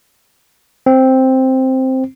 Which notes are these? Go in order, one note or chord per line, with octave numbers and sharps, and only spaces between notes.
C4